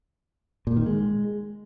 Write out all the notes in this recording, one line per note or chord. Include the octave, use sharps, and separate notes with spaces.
A#2
D#3
G#3